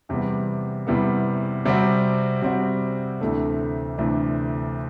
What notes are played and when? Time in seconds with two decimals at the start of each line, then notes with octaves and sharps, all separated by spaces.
0.09 E2 C3 E3 G3 B3
0.87 E2 C3 E3 G3 B3
1.65 C3 G3 C4 F#4
2.42 C3 G3 C4 F#4
3.20 D2 C3 E3 A3 D4
3.98 D2 C3 E3 A3 D4